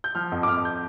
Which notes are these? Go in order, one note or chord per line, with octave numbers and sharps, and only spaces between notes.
G6
F3 F6
F2
D6
F2 F6
G6